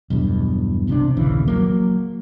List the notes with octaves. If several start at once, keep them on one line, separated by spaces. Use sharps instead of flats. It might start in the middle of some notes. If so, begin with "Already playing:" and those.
B1 E2 G2
C2 C3 F3 D4
A#1 D#2 C#3 E3
F#3 A#3